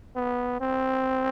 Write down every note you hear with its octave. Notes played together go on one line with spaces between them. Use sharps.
B3
C4